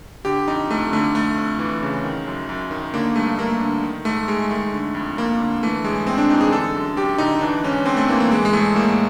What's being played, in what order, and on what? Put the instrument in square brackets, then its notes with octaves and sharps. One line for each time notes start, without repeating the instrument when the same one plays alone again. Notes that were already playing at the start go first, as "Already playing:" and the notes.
[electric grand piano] D3 G4
F2 D#4
F2 A3
D3 A3
F2 A3
F2
E3
C#3
D#3
F#2
F#2
D#3
D3 A#3
G2 A3
G2 A#3
D3
D#3
G#2 A3
G#2 G#3
D#3 A3
D3
F2
F2 A#3
D3
E3 A3
A2 G#3
A2 C4
D4
E3 D#4
G#4
D3 A4
F#2
F#2 G4
D3 D#4
E3 D4
G#2 C#4
G#2 C4
A3
E3 A#3
A#3
E3 G#3
G#3
A2 A3
A2 A#3